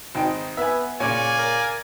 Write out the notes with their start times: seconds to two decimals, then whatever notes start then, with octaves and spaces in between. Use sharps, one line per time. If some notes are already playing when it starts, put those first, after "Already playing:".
0.15 G#1 D#4 G5
0.57 B3 E5 G#5
1.00 A#2 C#3 C#5 D5 F5 G#5
1.39 A#4